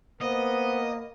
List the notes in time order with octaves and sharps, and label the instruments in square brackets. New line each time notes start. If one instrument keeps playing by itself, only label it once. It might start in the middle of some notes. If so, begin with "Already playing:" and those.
[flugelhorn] A#3 [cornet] B3 [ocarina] C5 [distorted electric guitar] D#5